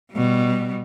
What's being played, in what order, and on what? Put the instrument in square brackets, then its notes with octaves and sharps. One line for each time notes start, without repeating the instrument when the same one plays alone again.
[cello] B2 G3